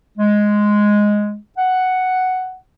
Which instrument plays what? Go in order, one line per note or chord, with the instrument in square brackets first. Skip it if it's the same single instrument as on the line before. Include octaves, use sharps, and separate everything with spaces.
[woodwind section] G#3
F#5